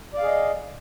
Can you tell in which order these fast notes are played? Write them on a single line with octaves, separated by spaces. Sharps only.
D5 F5 G#4 D#5